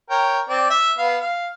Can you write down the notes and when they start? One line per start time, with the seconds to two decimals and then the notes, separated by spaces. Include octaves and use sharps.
0.10 A#4 C#5 G5
0.49 C4 D5
0.70 E5
0.98 B3 F5
1.21 F5